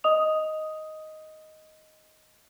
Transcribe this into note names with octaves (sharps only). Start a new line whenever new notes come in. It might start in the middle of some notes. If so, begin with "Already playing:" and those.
D#5 D#6 F7